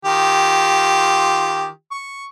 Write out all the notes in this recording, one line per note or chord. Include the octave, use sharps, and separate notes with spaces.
D#3 F4 G4
C#6